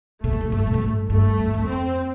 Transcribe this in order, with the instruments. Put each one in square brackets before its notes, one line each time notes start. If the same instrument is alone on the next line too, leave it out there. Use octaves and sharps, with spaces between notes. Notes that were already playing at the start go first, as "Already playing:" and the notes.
[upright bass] B2 [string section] A3
[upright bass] C3
B2
[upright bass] G2 [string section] A3
[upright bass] B2
A2
G2
[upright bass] G2 [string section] A3
[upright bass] G2
F2
[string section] C4